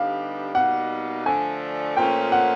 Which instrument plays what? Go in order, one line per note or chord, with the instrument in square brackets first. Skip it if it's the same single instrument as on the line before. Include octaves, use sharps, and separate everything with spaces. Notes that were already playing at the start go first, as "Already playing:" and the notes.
Already playing: [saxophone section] D3 G3 B3 D#4 G4 [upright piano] F5
[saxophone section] B2 G3 A#3 D#4 [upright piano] F#5
[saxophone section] D3 F3 A3 D4 [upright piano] G#5
[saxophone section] A#2 F3 A3 C#4 [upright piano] G5
[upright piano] F#5